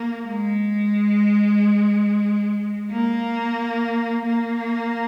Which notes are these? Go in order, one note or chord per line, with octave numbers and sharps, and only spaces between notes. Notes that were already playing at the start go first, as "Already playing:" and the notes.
Already playing: A#3
G#3
A#3
A#3